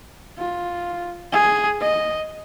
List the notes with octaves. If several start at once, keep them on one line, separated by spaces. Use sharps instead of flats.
F4
G#4
D#5